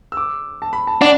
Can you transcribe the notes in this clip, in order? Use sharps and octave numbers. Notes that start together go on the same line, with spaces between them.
E6
D6
A5
B5
A5
D4 F#5